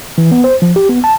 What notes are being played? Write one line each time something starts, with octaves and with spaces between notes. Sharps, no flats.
E3
B3
C5
F3
G4
B3
A5